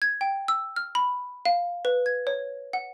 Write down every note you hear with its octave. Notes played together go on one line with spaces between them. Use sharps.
G#6
G5
E6
F6
B5
F5
B4
G#6
C#5
F#5